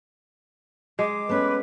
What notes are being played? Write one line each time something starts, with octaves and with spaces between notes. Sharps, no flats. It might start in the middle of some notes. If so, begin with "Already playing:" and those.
G#3 D6
A3 B3 C#4 B4